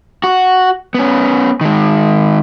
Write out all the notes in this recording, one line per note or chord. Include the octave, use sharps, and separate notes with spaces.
F#4
B3 C#4
D#3 G#3